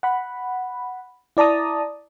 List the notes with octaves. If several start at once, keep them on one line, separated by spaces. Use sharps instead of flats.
F#5 B5
E4 D5 A5 A#5 D#6